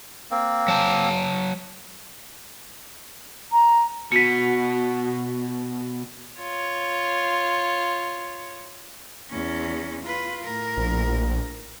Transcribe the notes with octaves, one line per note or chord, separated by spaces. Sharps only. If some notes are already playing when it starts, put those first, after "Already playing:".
A#3 C4
F#3 A5
A#5
B2 F#4 B6 C#7
F4 C#5
E2 C#4
F4 B4
A2 A#4
A#1